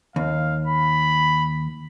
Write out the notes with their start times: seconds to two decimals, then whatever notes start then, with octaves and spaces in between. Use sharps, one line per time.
0.16 D#2 F5
0.67 B5